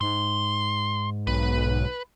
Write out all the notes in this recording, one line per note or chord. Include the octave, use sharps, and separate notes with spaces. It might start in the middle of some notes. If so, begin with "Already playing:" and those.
G#2 C6
B1 B4